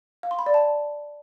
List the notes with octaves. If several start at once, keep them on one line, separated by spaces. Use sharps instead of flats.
F5
C6
B5
D5
A5